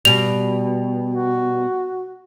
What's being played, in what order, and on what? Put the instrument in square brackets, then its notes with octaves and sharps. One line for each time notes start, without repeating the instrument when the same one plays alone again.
[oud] B2 G3 [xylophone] F7
[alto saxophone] F#4